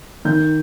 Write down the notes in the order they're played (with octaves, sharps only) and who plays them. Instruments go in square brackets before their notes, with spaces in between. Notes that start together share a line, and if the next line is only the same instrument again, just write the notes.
[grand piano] D#3 G6